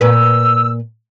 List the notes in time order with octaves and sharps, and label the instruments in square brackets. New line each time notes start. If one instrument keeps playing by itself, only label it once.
[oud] A#2 B4 [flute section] E6